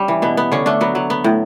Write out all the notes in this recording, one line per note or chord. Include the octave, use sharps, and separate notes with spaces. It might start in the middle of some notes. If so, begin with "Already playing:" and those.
Already playing: G2 G3 C#4
E3
B2 B3
B3
D3 C#4
A3 D4
F#3 B3
F#3
B3
A2